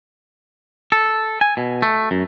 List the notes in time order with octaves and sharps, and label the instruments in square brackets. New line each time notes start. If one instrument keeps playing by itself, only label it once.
[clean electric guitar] A4
G#5
B2
A3
F#2